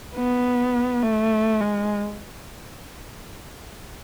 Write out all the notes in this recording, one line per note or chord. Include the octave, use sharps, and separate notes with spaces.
B3
A3
G#3